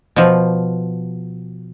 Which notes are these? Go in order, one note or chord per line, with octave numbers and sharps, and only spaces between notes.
B2 F3